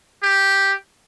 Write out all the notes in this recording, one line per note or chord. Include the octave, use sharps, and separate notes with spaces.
G4